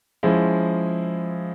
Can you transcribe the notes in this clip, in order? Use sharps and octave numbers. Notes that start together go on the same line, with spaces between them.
F3 G#3 C#4 E4 G#4